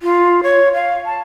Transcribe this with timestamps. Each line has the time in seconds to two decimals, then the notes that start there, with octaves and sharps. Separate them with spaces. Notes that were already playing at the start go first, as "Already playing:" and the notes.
0.02 F4
0.43 C#5
0.74 F5
1.06 A5